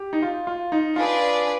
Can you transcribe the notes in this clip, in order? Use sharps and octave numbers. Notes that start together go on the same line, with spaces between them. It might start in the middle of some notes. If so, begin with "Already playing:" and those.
Already playing: G4
D#4
F4
F4
D#4
D4 F4 G#4 B4 D5